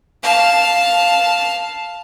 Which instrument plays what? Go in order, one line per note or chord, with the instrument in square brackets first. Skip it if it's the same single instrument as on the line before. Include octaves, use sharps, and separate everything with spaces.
[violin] F5 A5